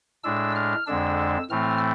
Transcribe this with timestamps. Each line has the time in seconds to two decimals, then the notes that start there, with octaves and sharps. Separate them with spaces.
0.24 A2 G#3 D4 E6
0.55 F6
0.87 F2 D3 G#3 D4 E6
1.50 A2 E3 A3 C4 F6